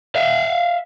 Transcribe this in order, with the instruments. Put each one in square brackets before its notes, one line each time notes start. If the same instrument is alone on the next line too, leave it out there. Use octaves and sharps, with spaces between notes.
[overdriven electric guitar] E5 F5